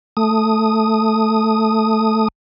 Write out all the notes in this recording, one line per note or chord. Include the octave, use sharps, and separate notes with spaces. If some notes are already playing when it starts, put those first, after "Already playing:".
A3 D#6